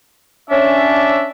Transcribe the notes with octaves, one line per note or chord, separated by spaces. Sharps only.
C#4 D4 E5